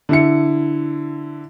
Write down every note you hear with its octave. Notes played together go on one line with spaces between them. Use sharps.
D3 E4 C#7